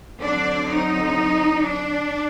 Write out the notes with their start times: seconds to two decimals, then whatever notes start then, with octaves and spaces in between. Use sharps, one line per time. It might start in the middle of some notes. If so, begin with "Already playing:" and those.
0.21 D3 F#3 C4 D4 D5
0.69 D#4
1.63 D4